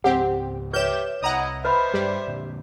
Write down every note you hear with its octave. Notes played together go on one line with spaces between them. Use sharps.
C#2 G#2 C4 G4 F#5
G4 B4 C#5 E5 G6 E7
C2 E4 D#5 F#5 A#5 D#6
B4 C5 D#5 E5 B5
G2 G3
A#2 D3